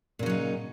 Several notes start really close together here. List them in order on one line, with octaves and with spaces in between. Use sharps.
A#2 C#3 F#3 D#4